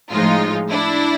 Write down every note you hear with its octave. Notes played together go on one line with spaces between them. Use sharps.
A2 F3 G#3 D#4 F4
D4 E4